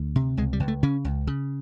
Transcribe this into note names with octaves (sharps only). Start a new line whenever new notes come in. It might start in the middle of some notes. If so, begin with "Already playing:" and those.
Already playing: D2
C3
C#2 G#3
G3
C#2
A3
C#3 C#4
C#2
C#3